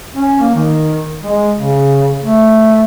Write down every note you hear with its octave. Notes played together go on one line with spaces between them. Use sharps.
C#4
A#3
D#3
G#3
C#3
A3